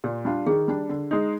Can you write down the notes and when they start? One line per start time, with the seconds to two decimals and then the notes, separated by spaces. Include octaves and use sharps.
0.04 A#2 G4
0.25 G3 D4 F4
0.46 D#3 G#4
0.68 G3 D4
0.89 D3
1.11 G#3 D#4